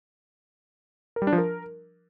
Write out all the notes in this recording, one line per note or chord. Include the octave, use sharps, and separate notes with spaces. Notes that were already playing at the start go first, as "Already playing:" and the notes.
A#4
G3
D4
F3
A#4